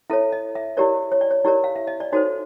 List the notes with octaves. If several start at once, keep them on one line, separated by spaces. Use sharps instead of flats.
E4 A4 C#5 E5
D#5
E5
E4 G4 A#4 C#5 D5
C#5
D5
C#5
E4 G4 A#4 C#5 D5
F5
E5
D#5
D5
D#4 F#4 A4 C5 C#5